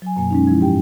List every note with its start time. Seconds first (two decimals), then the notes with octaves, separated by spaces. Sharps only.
0.02 F#3 G#5
0.16 F#2 B2 A#3 G#5
0.31 G#3 C#4 D#4
0.47 F3 G#3 E4
0.61 G#2 G4 G5